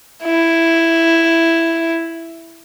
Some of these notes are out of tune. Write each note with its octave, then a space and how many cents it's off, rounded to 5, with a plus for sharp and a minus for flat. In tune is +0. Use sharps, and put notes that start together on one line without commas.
E4 +5